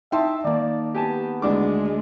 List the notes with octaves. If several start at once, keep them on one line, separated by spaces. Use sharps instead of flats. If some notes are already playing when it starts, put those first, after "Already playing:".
D#4 E5 G5 A5 C6
D#3 A#3 D5
B3 G4 G#5 A5
D2 G#3 D4 D6